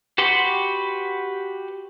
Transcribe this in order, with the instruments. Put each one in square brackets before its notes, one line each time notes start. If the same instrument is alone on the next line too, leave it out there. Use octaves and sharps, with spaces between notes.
[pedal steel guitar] F#4 G4 B4 F#5 C6